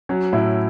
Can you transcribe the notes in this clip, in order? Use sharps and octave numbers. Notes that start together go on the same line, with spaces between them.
F#3 C#4
A2 E4